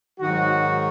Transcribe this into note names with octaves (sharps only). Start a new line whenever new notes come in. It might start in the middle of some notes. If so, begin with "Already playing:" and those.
G#2 D#3 F#3 F#4